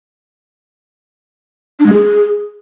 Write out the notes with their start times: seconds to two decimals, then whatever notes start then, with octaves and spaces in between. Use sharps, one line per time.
1.80 D4
1.86 G#3
1.93 G#4